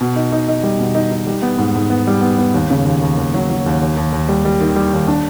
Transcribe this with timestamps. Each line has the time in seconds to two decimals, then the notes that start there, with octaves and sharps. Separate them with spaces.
0.01 B2
0.16 D#4
0.32 D#4
0.48 D#4
0.63 G3
0.79 B2
0.95 D#4
1.12 D#4
1.27 G3
1.42 B3
1.58 G#2
1.75 G#2
1.90 B3
2.07 G3
2.22 B3
2.38 B3
2.54 D#2
2.70 C#3
2.85 D#2
3.02 D#2
3.17 D#2
3.34 F#3
3.50 F#3
3.66 D#2
3.81 D#2
3.97 D#2
4.12 D#2
4.29 G3
4.45 G3
4.61 D#3
4.76 G3
4.93 D#2
5.08 D4